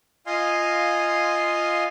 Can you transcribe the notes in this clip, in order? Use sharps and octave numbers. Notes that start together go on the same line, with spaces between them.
F4 D#5 F5 G#5 C6